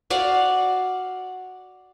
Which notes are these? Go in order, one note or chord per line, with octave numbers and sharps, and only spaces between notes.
F#4 D5 F5 F#5